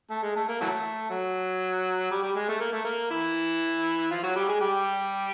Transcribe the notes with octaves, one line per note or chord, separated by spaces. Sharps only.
A3
G#3
A3
A#3
E3 F#3 A3
F#3
G3
G3
G#3
A3
A#3
A3
A#3
E3 E4
F3 F4
F#3 F#4
G3 G4
G#3 G#4
G3 G4